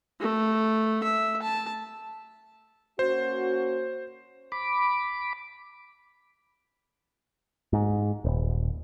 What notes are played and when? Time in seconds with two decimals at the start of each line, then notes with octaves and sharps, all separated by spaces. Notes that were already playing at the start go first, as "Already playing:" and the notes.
0.20 A3
1.04 E5
1.42 A5
2.99 A#3 C#4 F#4 C5
4.52 B5 D6
7.73 G#2
8.25 D#1